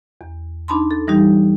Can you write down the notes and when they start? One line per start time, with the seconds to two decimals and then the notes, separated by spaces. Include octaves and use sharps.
0.21 E2
0.68 D4 D#4 A5 B5 C6
0.91 A4
1.08 E3 G3 D#4 G4